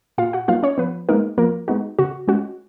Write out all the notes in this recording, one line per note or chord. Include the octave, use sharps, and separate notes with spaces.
A#2 F4 F5
F#4 F#5
F#3 A#3 D#4 F4 F5
C#4 C#5
F3 B3 B4
G#3 A#3 B3 D#4 A#4
F3 A#3 A#4
G#3 B3 D#4 F#4
C#3 F#4
G#3 C#4 F4 F#4